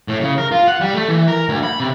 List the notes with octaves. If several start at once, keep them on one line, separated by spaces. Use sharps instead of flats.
A2
C#3
A#4
F4
F#5
G3
A3
E3
A#4
D2
B5
C3